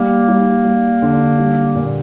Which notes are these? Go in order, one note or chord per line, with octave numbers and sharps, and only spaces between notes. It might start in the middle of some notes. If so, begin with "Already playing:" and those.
Already playing: G3 A#3
G3
G3
D3
G3
A#2